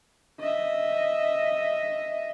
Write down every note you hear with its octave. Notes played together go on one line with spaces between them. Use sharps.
D#5 E5